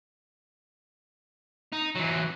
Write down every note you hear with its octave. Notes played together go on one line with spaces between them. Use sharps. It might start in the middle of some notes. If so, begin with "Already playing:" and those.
D#4
E3 F#3